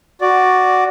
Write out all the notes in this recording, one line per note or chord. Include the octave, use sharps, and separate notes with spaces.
F#4 D5